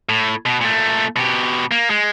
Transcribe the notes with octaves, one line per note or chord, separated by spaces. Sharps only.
A2
B2
A#2 A3
B2 G4
A#3
G#3